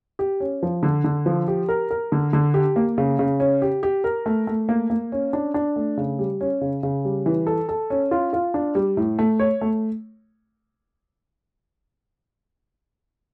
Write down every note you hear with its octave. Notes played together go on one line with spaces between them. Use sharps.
G4
C#4
F3
D3
D3
F3
G4
A#4
A#4
D3
D3
G4
A#3
C#3
C#3
C#4
G4
G4
A#4
A3
A3
A#3
A#3
C#4
D4
D4
A3
C#3
G3
C#4
C#3
C#3
G3
E3
A4
A4
C#4
F4
F4
D4
G3
A2
A3
C#5
A3